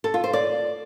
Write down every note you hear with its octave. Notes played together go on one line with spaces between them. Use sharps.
A4
F4
C5
D5